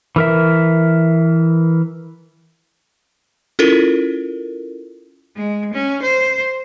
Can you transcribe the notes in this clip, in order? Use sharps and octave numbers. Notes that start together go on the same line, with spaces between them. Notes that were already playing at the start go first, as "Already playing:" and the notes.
E3 A#4 E5
C#4 E4 F4 A4 A#4
G#3
C#4
C5